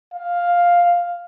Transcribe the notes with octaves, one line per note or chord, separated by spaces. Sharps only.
F5